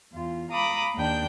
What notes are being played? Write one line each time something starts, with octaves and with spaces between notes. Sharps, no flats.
E2 F4
F5 A#5 B5 D6 D#6
D#2 D4 G5 G6